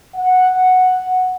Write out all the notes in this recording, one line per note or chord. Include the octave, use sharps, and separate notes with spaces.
F#5